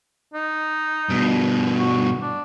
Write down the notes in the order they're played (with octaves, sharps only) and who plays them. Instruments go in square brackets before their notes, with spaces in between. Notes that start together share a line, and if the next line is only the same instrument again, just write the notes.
[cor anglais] D#4
[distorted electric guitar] G2 B2
[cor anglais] F#4
D4